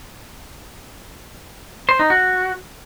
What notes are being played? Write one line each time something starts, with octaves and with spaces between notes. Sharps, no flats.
C5
D#4
F#4